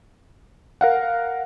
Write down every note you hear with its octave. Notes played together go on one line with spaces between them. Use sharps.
A#4 F5 F#5